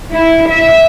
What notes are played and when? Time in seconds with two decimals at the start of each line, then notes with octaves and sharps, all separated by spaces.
0.14 E4
0.51 E5